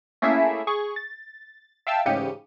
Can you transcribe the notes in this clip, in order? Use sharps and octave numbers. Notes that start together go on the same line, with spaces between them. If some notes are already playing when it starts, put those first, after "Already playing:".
A3 A#3 C#4 E4 G#4 E5
G#4 C#6
A6
E5 F5 G5 A5 E6
A1 G#2 C#3 G4 C#7 D#7